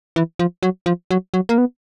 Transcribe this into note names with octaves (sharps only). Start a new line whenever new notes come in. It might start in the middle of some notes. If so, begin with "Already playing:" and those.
E3
F3
F#3
F3
F#3
F#3
A#3
B3